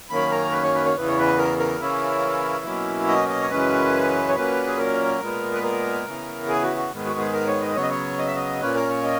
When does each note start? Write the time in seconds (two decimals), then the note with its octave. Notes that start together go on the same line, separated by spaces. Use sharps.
0.10 F#2 D#3 A#3 C#4 B5
0.31 A#5
0.52 B4
0.63 C#5
0.75 B4
0.86 C#5
0.95 E2 C#3 E3 B3 B4
1.08 C#5
1.19 B4
1.38 A#4
1.59 A#4
1.80 C#3 E3 A#3 C#4 E4
2.65 B2 F#3 A#3 C#4
3.08 D#5
3.29 D#5
3.42 C#5
3.50 F#2 C#3 E3 G#3 C#4 B4
4.29 C#5
4.35 A#2 F#3 A#3 C#4 B4
4.67 G#4
4.78 A#4
5.20 A#2 G#3 B3
5.53 B4
5.63 A#4
6.06 C#3 E3 B3
6.48 G#4
6.63 F#4
6.77 F#4
6.91 G#2 D#3 G#3 B3
7.05 F#4
7.19 G#4
7.34 A#4
7.47 C#5
7.62 D#5
7.76 C#3 F#3 B3 C#5
7.83 D#5
7.90 C#5
8.18 D#5
8.27 E5
8.36 D#5
8.61 A#2 A#3 C#4 B4
8.75 A#4
8.90 C#5
9.03 D#5